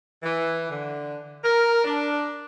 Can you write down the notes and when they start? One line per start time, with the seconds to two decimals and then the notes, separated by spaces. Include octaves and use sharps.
0.22 E3
0.70 D3
1.44 A#4
1.84 D4